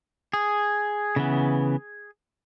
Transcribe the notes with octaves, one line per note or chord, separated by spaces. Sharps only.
G#4
C#3 E3 B3